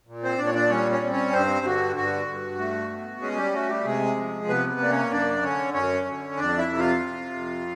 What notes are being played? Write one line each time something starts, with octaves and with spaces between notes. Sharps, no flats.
A#2
C4 C5
A#2 D4 D5
C#5
D4 D5
G3 C#4 C#5
C#4 C#5
C4
C#4 C#5
G2 C4 C5
D3 F#4
G2 F#4
G2
A3
B2
G#3 C#4 G#4
G3 G4
A3 F#4
G3 G4
C3 G#3 G#4
F3
C3 B3 B4
B3 B4
A#3 D5
C#4 C#5
F#2 D4 D5
D3 C#4 C#5
F#2 C#4 C#5
D3
F2 D4 D5
E4 E5
C3
F4 F5
C3
F2